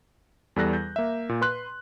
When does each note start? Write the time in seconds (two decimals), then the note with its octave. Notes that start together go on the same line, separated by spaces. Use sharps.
0.56 E2 G3 A4 F#6 A#6
0.73 G6
0.96 A#3 E5
1.29 A#2
1.41 B4 C6 F#6